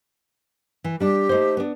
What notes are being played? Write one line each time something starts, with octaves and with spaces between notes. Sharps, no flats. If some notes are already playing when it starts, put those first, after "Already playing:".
E3
G3 D4 G4
A3 D#4 C5
B3 D4